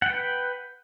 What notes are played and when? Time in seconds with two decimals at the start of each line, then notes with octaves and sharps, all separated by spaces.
0.02 F#5
0.06 G5
0.10 B4